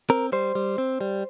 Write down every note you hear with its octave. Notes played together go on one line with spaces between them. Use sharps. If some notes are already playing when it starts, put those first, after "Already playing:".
C4 A#4
G3 C5
G3
C4
G3